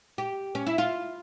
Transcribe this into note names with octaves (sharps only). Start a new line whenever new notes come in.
G4
C#4
E4
F4